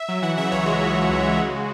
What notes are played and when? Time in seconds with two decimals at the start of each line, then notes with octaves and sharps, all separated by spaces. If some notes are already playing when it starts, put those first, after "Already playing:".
Already playing: E5
0.08 F#3
0.22 E3 F#5
0.37 C#3 E5
0.51 C#2 C#5
0.66 G#3 F#4
0.80 E3
0.95 C#3
1.10 C#2
1.24 G#3
1.38 C#3